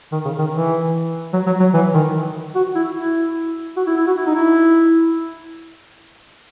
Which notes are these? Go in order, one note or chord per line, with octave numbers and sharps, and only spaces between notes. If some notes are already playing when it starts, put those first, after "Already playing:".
D#3
C#3
D#3
E3
F#3
F#3
F#3
E3
D#3
F#4
E4
E4
F#4
E4
E4
F#4
E4
D#4
E4